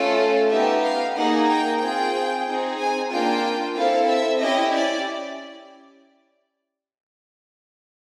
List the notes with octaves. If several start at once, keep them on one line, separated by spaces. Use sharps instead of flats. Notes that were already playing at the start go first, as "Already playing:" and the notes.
Already playing: A3 C#4 F4 A4
B3 D#4 G4 E5
F5
A#3 D#4 G#4 F#5
G5
C4 F4 G#4 G5
C4 D#4 G#4
G#5
A#3 D4 F4 G5
C4 E4 A4 F5
E5
C#4 E4 G4 D#5
D5